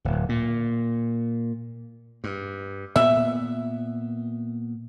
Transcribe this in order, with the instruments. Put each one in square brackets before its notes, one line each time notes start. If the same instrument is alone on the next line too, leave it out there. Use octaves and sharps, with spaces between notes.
[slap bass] D1
A#2
G2
[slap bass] A#2 B3 [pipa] E5